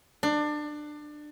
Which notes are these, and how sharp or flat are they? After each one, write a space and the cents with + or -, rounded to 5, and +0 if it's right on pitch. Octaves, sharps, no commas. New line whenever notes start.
D4 +25